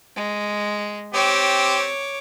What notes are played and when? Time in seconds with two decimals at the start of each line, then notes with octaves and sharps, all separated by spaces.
0.16 G#3
1.14 C4 G4 C#5 D6